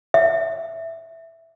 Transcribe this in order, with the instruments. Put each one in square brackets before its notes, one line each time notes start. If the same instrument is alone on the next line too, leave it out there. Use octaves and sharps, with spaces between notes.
[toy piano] E5